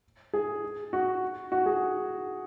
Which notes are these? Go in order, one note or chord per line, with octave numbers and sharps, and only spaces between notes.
G#4
F#4
F#4
G#4